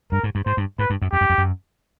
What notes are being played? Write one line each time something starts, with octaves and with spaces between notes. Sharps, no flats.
G2 A#4
G#2
G2
G#2 C5
G2
G#2 B4
G2
F#2
F2 G4
F#2
F2
F#2